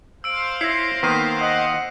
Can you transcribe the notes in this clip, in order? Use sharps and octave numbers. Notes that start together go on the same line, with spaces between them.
C5 F5 E6 D7
E4 C#5 A#6 C7
D#3 A#3 B3 B6 D#7
D#5 F#5